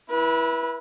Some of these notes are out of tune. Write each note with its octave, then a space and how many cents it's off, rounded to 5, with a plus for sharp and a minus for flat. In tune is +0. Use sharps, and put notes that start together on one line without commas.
E4 +0 B4 -30